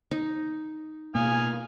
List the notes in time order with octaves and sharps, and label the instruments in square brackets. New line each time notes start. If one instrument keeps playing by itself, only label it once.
[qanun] D#4
[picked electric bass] B2 A#3 [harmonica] F5 G#5 D#6